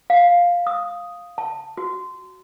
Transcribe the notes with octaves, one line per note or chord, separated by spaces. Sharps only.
F5
D#6
A5
F#4